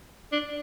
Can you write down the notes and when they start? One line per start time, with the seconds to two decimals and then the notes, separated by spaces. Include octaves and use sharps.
0.32 D4